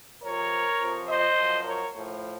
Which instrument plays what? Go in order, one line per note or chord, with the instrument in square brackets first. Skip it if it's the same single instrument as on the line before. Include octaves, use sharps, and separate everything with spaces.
[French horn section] F2 C3 F3 A#4 C#5
F2 C3 F3
C5 D#5
F#2 F3
A#4 C#5
A2 F3